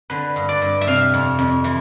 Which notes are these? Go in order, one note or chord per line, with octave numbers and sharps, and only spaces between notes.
D3 B4
G2
D5
G2
E5
C3 F5
F2
F2
E3